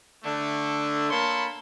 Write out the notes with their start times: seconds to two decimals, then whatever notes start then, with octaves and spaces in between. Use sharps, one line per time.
0.24 D3 A3
1.10 A#3 A#4 C#5 A5 B5 C6